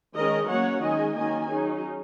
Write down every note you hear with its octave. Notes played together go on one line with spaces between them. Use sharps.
D#3 G#3 C#4 A#4 D#5
F#3 A#3 C#4 C#5 F#5
D#3 G#3 C#4 D#5 G#5
D#3 F#3 A#3 C#4 D#5 G#5
F#3 C#4 D#4 G#4